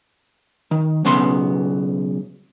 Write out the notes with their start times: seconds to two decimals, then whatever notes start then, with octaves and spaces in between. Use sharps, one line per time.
0.71 D#3
1.05 B1 C#3 B3 C6